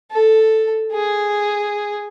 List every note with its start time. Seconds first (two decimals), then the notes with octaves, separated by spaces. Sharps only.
0.11 A4
0.92 G#4